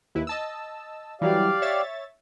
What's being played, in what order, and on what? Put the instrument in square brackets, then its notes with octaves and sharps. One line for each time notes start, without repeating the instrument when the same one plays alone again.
[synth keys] D#2 E4 B4
D#5 A5 E6
[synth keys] E3 F#3 G3 [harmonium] G4 D5 F5
[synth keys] C#5 E5 A6